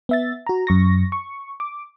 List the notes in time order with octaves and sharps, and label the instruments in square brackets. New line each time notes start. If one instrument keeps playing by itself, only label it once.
[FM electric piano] B3 E5 A6
F#4 A#5
F#2 C#6 A#6
C#6
D6